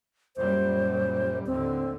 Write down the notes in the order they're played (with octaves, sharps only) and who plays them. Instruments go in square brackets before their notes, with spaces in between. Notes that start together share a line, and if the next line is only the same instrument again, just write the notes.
[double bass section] F#2 A#2 G3 [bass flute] C5
[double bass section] D#2 A2 D3 [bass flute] C4